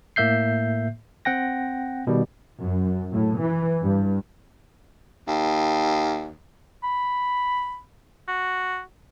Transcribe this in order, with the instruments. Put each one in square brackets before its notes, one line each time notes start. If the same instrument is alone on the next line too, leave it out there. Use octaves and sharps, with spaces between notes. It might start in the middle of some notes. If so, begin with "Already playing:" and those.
[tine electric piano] A2 A#3 E5 G6 C7
C4 F#5 G5 A#6
B2 D#3 G3
[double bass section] F#2
A2
E3
G2
[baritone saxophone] D#2
[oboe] B5
F#4